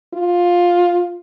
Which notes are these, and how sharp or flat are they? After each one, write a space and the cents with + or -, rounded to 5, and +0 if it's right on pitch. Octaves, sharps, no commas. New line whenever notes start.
F4 +10